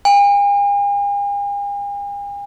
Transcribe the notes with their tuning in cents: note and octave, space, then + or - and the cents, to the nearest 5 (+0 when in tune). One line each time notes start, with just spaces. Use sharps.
G#5 -45